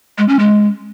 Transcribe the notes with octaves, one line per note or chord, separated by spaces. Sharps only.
G#3
C#4
G#3